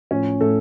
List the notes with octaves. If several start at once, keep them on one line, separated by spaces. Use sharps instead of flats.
A2 F3 C#4 C#5
A2 F3 A3 A4